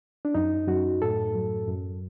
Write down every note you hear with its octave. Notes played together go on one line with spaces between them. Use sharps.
D4
F#2 D#4
F#2 F#4
A2 A4
F#3
F#2